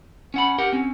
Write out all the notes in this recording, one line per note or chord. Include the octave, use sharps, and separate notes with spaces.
C#4 F#5 B5
G4 A#4 F#5
C4 C#4